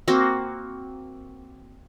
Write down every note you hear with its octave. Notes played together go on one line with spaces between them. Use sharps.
A#3 C4 F#4